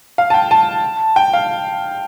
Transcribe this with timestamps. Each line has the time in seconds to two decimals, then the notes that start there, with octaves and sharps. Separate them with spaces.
0.18 F5
0.30 A5
0.34 G5
0.51 A5
1.16 G5
1.33 F5